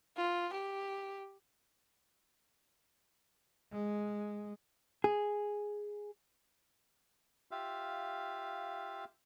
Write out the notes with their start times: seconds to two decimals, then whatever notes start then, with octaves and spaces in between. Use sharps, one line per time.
0.17 F4
0.53 G4
3.72 G#3
5.04 G#4
7.51 F4 G4 E5 F5